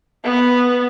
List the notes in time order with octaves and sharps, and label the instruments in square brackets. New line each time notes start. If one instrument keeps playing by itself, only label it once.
[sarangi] B3